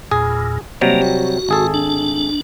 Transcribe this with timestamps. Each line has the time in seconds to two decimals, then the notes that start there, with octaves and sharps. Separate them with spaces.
0.11 E2 A#2 G#4
0.81 C3 F#3 G3 A#3
1.02 F#4
1.49 G#1 G#4 A4
1.74 D4